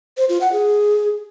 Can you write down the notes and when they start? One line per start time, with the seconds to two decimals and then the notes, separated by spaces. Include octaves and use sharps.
0.17 C5
0.29 F4
0.41 F#5
0.53 G#4